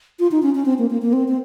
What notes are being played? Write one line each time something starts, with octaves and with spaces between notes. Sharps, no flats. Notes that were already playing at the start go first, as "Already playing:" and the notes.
F4
D#4
C#4
C#4
C4
A#3
A#3
A#3
C4
C4